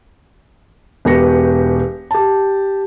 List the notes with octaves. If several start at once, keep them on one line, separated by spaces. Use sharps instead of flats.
E1 B2 G4 B4 A#6 C#7
G4 A5